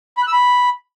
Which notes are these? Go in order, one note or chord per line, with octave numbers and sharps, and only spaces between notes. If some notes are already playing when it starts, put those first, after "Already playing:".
B5
F#6
E6
B5